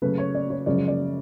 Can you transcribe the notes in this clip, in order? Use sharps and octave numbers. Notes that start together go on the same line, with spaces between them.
F#2 C#3 F#3 A3 B4
C#5
D5
C#5
F#2 C#3 F3 G#3 D5
D5